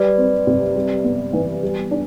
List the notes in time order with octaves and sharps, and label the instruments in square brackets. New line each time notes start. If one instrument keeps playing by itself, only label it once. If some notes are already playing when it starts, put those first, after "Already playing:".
Already playing: [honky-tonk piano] G3 [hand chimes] B4 D5
[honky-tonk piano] C4
C3
G3
B3
E3
G3
D4